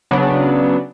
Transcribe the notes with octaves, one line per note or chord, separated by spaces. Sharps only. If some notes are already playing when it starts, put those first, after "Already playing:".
C#3 F#3 B3 D4